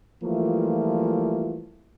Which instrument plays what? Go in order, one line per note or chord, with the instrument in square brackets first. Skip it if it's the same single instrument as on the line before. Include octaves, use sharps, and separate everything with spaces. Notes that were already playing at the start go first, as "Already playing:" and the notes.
[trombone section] E3 F3 G3 A3 A#3 F4